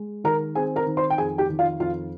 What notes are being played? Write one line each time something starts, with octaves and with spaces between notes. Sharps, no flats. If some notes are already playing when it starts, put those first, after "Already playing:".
Already playing: G#3
D#3 A#4 A#5
C4 G#4 G#5
A#4 A#5
D#3
C5 C6
G5
F2 G#4 G#5
G4 G5
D#3
F4 F5
F2 F4 F5